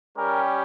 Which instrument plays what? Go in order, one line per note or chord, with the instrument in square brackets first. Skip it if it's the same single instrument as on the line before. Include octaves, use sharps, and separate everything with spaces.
[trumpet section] G3 C#4 G4 A#4